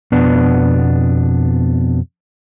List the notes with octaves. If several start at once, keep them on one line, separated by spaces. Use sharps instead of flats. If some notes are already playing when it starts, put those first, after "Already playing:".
F2 B2 B3 D4